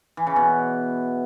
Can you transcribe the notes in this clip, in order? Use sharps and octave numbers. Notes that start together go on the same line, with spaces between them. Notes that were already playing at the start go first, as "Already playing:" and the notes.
E3
C#3
B2